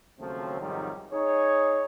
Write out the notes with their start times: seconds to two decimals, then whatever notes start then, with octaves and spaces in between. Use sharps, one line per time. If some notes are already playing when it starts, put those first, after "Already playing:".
0.20 D#2 C#3 F3 F#3 A3 C4
0.61 F2 G#2 C3 D#3 F#3 G3
1.13 D#4 G#4 C#5